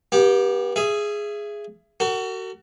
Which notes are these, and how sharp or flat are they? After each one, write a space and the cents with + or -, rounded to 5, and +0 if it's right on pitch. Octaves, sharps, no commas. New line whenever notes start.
B3 -40 G4 +0
G#4 +0 E5 +30
F#4 +25 A#4 -45